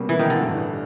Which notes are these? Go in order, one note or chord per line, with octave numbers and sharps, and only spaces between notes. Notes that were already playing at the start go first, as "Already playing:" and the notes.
Already playing: C2 B2 G3 A#3 C#4
E3
D#3
D3
A1 G2 E3